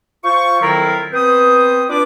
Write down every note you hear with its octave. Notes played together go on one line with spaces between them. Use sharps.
F4 C5 C#6
F2 D#3 F#3 E4 F4 A#4
B3 C4 B4 C5 D#6
D4 F4 B4 D6